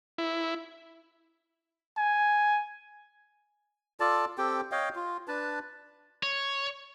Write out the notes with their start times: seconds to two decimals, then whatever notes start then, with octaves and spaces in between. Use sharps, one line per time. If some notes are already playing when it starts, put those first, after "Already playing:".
0.18 E4
1.97 G#5
4.00 F4 A4 D5 A5
4.38 C4 G4 A4 G5
4.72 C#5 D#5 F5 G5
4.95 F4
5.28 D4 B4 A5
6.23 C#5